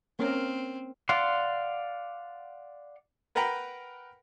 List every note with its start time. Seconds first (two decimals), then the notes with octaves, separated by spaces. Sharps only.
0.19 A#3 C4 C#4 A#4
1.09 D5 F5 F#5 C6
3.35 A#4 B4 F#5 G5 A#5 B5